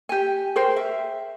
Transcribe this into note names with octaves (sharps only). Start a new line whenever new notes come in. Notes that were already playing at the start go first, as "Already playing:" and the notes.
G4 G#5
G#4 A#4 C5 G5
E5